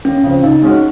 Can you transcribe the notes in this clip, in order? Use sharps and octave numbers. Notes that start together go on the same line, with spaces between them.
D#2 C#4
C#3 F3 C4
C#3 D#4
G#3 C#4 F#4